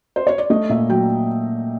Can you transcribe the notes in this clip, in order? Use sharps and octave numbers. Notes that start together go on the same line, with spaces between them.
C5
C#5
D5
A3 D#5
A#2 E5
F#3 G5